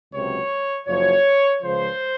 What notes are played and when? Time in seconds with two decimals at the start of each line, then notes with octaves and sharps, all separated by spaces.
0.12 C#2 C3 F#3 C#5
0.88 F#1 F#2 F3 C#5
1.63 C#2 C#3 F3 C5